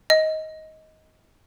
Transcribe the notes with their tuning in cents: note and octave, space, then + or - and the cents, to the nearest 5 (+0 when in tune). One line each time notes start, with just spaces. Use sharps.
D#5 +15